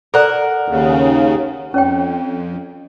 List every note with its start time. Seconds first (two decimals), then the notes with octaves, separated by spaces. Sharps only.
0.14 A4 A#4 D5 F#5 A#5
0.68 D#2 C#3
1.74 F2 C#4 C#5 G5